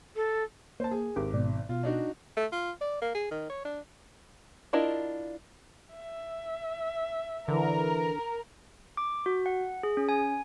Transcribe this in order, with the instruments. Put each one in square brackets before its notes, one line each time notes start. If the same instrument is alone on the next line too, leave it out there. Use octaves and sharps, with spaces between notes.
[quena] A4
[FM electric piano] A#3 [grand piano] C5 A5
[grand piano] G#4
[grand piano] G#1 [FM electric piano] G4 A#4 D6
[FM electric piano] G#2 B2 D5
[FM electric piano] B2 [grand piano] F4
[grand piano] D4 D#4 F#4
[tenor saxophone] A3
F4
D5
A#3
G#4
D#3
C#5
D4
[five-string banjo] D4 E4 F4 A#4 D#5
[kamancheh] E5
[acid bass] D3 [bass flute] E3 [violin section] A#4
[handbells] D6
F#4
F#5
G#4
C#4
G#5